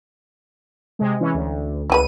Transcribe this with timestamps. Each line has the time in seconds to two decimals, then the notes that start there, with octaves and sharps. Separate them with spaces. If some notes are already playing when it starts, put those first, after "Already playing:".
0.99 C3 G#3
1.20 E3 C#4
1.34 D2
1.90 C#2 E4 G4 B4 D#7